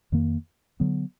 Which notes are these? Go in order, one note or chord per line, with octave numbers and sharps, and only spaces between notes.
F2 D#3 A#3
D3 F#3 B3